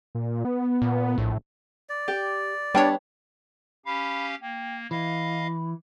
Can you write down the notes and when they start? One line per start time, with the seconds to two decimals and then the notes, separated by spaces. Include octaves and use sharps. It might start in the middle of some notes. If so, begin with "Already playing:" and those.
0.15 A#2
0.45 B3
0.82 A#2
1.18 A#1 A2
1.90 D5
2.08 G4
2.75 G3 B3 D4 C#5 G5
3.86 C#4 G4 F5 B5
4.41 A#3 G5
4.91 E3 D#5 F5 B5